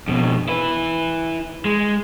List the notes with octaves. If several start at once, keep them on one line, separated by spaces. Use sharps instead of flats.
F2 B2
E4 B4
G#3